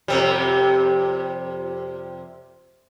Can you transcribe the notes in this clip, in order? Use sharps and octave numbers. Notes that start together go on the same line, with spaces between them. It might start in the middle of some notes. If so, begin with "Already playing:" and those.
F2 C3 G3